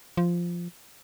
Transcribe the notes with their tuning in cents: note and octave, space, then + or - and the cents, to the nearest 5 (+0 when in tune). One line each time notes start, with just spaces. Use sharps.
F3 -5